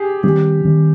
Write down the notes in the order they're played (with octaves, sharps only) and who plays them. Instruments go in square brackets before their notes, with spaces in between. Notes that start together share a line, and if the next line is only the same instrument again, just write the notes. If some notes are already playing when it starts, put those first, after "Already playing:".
Already playing: [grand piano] G4 G#4
[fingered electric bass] D#3 G3 C4 [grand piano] G4
[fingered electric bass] D#3 G3 C4